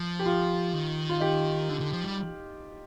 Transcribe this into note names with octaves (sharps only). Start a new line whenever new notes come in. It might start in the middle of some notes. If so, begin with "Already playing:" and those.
Already playing: F3
G4
F4
D#3
F4
D#4 G4
D3
D3
F3
G3